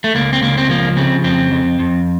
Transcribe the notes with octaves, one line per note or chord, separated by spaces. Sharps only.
A3
C#2 A#3
C4
C#2 A#3
C4
F3 A#3
C#3 C4
F2 C4
F2
F2